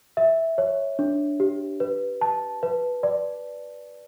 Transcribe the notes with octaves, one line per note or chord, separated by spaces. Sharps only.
E5
C#5
D4
G4
B4
A5
B4
D5